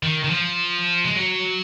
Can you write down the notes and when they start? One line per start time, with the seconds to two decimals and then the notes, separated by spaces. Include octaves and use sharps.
0.03 D#3
0.24 D#3
0.30 F3
1.04 G#3
1.15 F#3